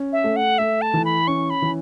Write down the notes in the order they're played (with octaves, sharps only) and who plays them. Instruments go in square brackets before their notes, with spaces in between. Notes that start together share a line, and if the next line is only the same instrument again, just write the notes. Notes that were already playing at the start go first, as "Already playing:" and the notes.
Already playing: [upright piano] C#4
[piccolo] E5
[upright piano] A3
[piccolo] F#5
[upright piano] A3 [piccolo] E5
[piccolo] A5
[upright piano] E3
[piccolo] B5
[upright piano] C#4 [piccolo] C#6
[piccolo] B5
[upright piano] E3